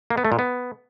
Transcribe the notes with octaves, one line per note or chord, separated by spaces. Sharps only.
A#3
B3
A3
A#2
B3